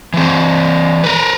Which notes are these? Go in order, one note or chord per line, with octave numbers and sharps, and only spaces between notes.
E3 C4
A#4 B4